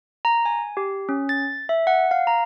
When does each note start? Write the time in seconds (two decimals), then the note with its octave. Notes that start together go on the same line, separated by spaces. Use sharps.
0.25 A#5
0.45 G#5
0.77 G4
1.09 C#4
1.29 A6
1.69 E5
1.87 F#5
2.11 F5
2.27 A#5